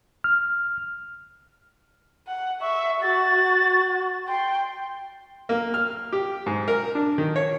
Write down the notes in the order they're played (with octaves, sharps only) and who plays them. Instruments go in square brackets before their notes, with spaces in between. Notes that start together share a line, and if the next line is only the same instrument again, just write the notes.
[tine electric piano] F6
[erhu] F#5
[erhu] E5 [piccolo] C#6
[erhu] F#4 [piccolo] A6
[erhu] G5 [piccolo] C6
[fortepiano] A#3
F6
G4
G#2
A#4
D4
D#3
C#5